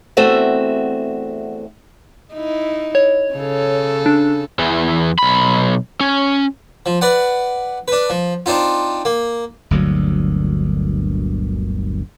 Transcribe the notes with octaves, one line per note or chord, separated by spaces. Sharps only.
E2 A3 C4 F#4 E5
D#4 E4
C#5
C#3 A4
D4
E2 E3
B1 B5
C#4
F3
B4 D5 F#5
D4 B4
F3
C4 D4 D#4 F4
A#3
G1 D2 A#2 F#3